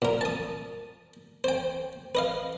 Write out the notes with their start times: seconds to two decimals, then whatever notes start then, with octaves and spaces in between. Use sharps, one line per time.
0.02 A#2 A#4
0.21 A5 D#6
1.44 C5 G5
2.15 B4 D#5 F5